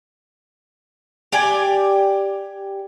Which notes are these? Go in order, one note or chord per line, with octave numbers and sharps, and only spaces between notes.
G4 D5 G5 G#5